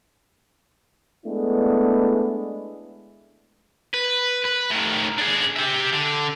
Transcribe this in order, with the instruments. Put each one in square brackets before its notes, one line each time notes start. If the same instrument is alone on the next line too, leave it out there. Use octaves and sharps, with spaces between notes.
[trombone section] G#3 A3 B3 D4 E4
[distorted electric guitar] B4
B4
A2 D#3
D4 G#4
G4 E5
D3